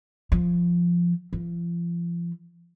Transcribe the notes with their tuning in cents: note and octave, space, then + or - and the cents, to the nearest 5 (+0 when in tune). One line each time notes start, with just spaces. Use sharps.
F3 -5
F3 -35